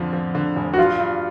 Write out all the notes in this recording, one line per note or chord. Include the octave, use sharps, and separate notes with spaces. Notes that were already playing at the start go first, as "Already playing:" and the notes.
Already playing: F2 D3 F3
F3
D3
F1
F#4
G2 F4
G2